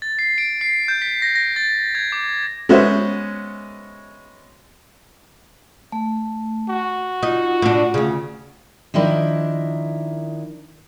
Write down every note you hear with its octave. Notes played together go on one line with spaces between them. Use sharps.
A6
C7
D7
C7
G6
B6
A#6
A#6
A6
G#6
D6
G#3 B3 C#4 F#4 C5 E5
A3
F#4
D#4 F4
A2 D4
D2 C#3
D#3 F3 D4 E4 A#4